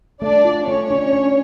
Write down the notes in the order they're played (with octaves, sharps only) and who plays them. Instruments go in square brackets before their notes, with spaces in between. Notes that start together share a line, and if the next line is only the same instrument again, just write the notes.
[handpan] A3 [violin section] D4 D5
[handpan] F4
[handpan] A3 [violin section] C#4 C#5
[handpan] D4
D4